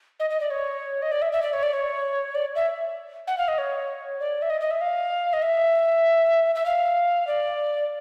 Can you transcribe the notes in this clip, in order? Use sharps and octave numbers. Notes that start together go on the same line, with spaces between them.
D#5
D#5
D5
C#5
D#5
D5
E5
E5
D5
C#5
D5
C#5
D5
E5
F#5
F5
D#5
C#5
D5
E5
D#5
D#5
E5
F5
D#5
E5
E5
F5
D5